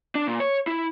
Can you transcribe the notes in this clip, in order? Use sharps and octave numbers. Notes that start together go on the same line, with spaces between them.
D4
A#2
C#5
E4